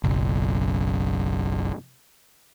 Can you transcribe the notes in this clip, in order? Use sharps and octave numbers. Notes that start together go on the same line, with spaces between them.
F#1 B1